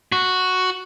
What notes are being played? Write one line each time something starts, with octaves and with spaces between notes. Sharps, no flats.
F#4